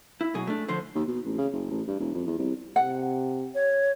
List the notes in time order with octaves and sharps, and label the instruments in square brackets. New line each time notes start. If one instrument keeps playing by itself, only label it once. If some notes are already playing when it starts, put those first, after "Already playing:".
[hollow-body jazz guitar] E4
B2 F#3 G#4
A3 D4
D3 F3 C5
[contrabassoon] D#2
B2
A1
C#3
F#1
A1
G2
E1
F2
E2
C2
[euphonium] C3 [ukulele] F#5
[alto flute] C#5